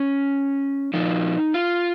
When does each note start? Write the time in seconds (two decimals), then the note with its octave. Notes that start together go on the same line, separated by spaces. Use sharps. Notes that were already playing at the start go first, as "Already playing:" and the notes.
Already playing: C#4
0.94 A#2 F3 D#4
1.54 F4